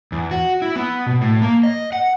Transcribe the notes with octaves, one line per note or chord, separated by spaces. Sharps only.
E2
F#4
E4
B3
B2
A2
A#3
D#5
F#5